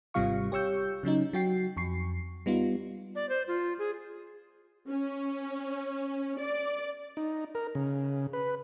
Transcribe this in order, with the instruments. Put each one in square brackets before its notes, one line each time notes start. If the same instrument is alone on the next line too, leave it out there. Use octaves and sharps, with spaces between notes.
[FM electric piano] G#1 C3 G3 F4 F5 C#6
G4 C#5 C#6 E6 G6
C#3 F#3 C#4 D#4
F#3 F#4 G5 C7
F2 C#6 C7
G3 B3 D#4 F4
[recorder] D5
C5
F4
G#4
[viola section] C#4
D5
[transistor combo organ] D#4
A#4
C#3
B4